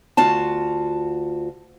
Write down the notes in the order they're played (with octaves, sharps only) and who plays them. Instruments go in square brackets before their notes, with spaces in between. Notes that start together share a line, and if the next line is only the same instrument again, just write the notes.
[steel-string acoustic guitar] D2 F4 F#4 A5